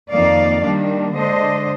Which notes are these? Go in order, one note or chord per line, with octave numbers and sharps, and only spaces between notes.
F2 D#3 A#3 D#4 D5 F5
D#3 G3 A#3 D4
D3 G#3 D4 C5 D#5